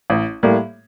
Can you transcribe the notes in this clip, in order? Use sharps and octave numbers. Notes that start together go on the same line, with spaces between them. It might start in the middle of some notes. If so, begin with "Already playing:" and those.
A1
A2 G3 A#3